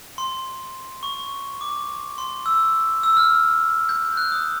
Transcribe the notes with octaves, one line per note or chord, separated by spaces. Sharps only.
C6
C#6
D6
C6
E6
E6
F6
G6
F#6
D#6